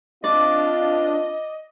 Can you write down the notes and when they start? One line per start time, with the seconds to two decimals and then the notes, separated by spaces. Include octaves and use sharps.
0.24 C4 D4 F4 D5 D#5